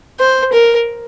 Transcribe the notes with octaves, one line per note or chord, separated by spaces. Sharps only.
C5
A#4